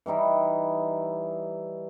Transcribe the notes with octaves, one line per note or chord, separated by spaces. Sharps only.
E3 G3 D#4 E4